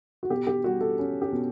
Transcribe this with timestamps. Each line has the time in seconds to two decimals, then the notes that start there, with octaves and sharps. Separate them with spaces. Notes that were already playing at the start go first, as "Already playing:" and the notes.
0.23 F#4
0.30 B2 G4
0.47 G4
0.64 G3 F#4
0.81 A4
0.99 C#4
1.22 G4
1.32 B2